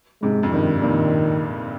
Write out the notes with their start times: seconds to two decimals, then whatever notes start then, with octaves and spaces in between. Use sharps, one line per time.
0.22 G#2 C3 G#3
0.43 F2
0.52 G2 D#3
0.82 G2 A#2 D#3